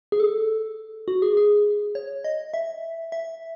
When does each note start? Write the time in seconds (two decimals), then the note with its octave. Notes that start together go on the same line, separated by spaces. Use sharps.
0.12 G#4
0.20 A4
1.08 F#4
1.22 G#4
1.37 G#4
1.95 C#5
2.24 D#5
2.54 E5
3.12 E5